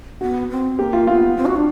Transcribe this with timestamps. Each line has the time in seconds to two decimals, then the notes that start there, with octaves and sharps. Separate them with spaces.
0.21 B3 F#4
0.50 C4
0.79 A#3 G4
0.93 F4
1.07 B3 F4
1.37 C4
1.46 F#4
1.56 D4